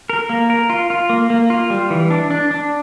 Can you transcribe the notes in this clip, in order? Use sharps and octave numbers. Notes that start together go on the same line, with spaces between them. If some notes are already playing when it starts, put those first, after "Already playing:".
A#4
A#3
A#4
F4
F4
A#3
A#3
F4
G3
E3
D4
D4
D4